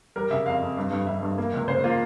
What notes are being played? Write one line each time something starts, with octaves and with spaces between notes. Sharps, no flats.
G3 A#4
C#3 E5
F2 F5
F2
G2
G2
G2 E5
G2
A#3
C#2
C#3 C5
A#3 F4